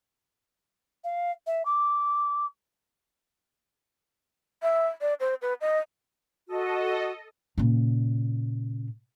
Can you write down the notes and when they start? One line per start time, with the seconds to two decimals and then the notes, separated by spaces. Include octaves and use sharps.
1.04 F5
1.46 E5
1.65 D6
4.62 E5
5.01 D5
5.20 C5
5.42 B4
5.61 D#5
6.48 F#4 A4 D#5
7.58 A#2 C#3